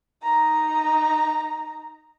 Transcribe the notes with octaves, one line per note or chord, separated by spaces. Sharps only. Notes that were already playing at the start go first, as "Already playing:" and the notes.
D#4 A#5